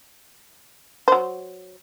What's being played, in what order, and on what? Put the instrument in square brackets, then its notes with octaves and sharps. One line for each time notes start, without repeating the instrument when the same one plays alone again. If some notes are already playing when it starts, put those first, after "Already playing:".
[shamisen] F#3 C5